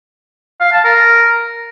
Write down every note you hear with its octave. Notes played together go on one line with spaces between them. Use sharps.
F5
A5
A#4